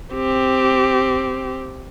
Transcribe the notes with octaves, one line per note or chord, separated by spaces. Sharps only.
C4 G4